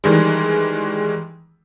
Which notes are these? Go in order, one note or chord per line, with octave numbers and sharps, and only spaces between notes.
D#3 E3 G3 G#3